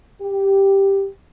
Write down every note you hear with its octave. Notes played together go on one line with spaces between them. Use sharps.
G4